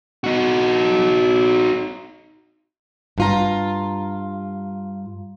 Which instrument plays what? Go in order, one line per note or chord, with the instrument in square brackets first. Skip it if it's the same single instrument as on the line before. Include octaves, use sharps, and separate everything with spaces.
[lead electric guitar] D#4 F#4
[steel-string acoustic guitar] G2 F4 A#5